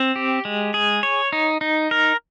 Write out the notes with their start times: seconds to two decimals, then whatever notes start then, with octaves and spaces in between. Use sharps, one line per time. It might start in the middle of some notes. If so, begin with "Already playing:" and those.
Already playing: C4
0.16 G4
0.45 G#3
0.74 G#4
1.03 C#5
1.33 D#4
1.61 D#4
1.91 A#4